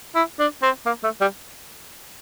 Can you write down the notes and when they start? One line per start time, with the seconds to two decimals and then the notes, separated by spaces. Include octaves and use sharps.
0.16 E4
0.40 D4
0.63 C4
0.86 A#3
1.04 A3
1.21 G3